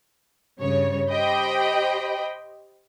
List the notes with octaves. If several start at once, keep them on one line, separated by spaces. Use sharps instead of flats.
G2 C#3 C#5
G4 C5 D#5 G5 B5